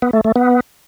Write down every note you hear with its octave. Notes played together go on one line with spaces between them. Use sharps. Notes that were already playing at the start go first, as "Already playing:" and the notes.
B3
A3
A3
B3